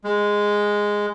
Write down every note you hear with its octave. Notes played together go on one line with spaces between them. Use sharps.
G#3